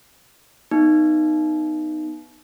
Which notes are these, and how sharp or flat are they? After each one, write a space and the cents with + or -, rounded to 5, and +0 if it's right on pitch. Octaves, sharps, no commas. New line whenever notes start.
B3 +0 D#4 -10